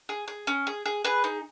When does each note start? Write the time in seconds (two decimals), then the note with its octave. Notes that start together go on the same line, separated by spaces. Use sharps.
0.09 G#4
0.28 G#4
0.47 C#4
0.67 G#4
0.86 G#4
1.04 G#4 B4
1.24 D#4